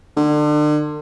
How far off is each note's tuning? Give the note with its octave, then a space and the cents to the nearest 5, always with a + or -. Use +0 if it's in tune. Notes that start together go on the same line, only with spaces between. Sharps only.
D3 +35